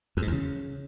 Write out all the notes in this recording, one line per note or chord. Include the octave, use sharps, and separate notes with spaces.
F2
G#2
E2
C#3